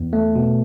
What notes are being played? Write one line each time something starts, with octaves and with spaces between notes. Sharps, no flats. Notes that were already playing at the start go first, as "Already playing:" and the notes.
Already playing: E2
A3
B2